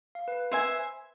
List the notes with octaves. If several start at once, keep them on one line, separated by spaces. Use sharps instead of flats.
F5
B4
B4
C5 E5 G#5